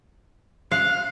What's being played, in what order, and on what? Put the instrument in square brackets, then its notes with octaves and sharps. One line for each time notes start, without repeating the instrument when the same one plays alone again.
[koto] F5 [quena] F#6